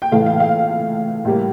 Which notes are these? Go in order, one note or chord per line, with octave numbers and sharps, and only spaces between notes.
G5
A2 E3 A3 F5
F5
F5
A2 G3 A#3